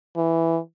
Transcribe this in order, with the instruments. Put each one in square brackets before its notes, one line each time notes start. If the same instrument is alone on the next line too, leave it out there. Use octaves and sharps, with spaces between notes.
[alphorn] E3